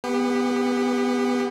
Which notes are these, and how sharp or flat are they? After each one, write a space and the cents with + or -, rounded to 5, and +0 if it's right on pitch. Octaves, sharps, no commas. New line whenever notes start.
B3 +0 G4 +35